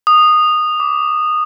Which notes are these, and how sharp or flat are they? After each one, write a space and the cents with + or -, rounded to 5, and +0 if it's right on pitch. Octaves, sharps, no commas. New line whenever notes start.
D#6 -15
D6 -15